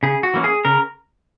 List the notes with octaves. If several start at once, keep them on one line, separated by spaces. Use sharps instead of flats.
C#3 G#4
F#4
E3 A#3 C#4
G#4
C#3 A#4